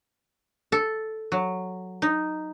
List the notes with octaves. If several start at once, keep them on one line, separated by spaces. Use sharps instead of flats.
A4
F#3
D#4